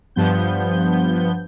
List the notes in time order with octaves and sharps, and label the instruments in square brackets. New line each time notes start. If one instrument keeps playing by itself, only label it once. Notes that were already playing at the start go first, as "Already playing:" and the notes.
[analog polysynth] G2 F3 B3 G6